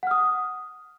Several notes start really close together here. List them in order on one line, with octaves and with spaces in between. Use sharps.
F#5 F6 D#6